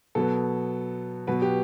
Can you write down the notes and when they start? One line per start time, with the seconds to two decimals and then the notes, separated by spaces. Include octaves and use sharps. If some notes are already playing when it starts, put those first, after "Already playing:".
0.15 B2 F#3 B3 A4
1.27 B2 F#3 B3 B4
1.42 G4